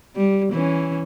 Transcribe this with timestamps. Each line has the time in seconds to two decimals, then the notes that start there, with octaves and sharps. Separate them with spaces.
0.16 G3
0.52 E3 C#4